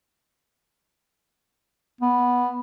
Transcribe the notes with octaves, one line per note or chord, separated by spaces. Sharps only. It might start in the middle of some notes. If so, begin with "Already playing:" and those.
B3